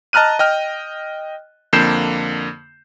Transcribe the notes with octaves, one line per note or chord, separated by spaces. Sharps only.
D#5 A5 A#5 F6 F#6 D#7
D#5 G5 F6
F2 D3 A#3 G6 C7 E7